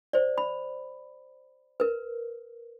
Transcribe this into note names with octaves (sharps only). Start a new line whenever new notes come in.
C5 D5
B5
A#4 B4